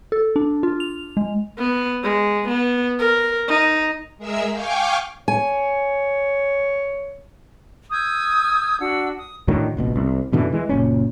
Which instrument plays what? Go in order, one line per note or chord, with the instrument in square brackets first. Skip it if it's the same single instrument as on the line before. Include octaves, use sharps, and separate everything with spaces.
[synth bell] A4
D4
F4
F7
G#3
[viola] B3
G#3
B3
A#4
D#4
[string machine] G#3 G#4 A#4 E5 E6
F5 G5 G#5 C#6 D6
[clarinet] C#5 [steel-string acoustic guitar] G#5
[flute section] D#6 E6 G6 G#6
D4 F#4 F#5 E6
D#6
[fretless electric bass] A2 D3 D#3 F#3
F1 A#1 B2
C2
F#2 B2 D3 E3
E3 G#3
F#1 A#2 C#4